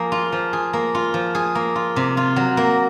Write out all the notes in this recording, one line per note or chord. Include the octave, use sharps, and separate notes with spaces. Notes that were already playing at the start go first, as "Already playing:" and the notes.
Already playing: F3 A#3 G#4
F4
F3
G#4
A#3
F4
F3
G#4
A#3
F4
C3
F4
F#3
A#3